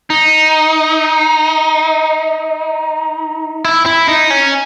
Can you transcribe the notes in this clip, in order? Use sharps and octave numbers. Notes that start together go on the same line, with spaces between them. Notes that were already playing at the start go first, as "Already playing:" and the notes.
D#4
E4
E4
D#4
C#4